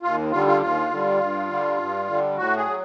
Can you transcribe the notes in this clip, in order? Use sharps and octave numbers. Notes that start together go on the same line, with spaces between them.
D#2 F4
D3 G3 F4
F4
D#2 F4
D3 G3
G2
D3 G3
G2
D3 G3
A2 F#4
G#4
F#3